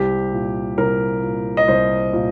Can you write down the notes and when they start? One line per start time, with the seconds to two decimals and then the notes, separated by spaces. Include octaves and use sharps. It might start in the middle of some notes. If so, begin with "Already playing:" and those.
Already playing: C2 G4
0.32 A#2
0.78 C2 A#4
1.23 A#2
1.57 D#5
1.68 C2 C5
2.13 A#2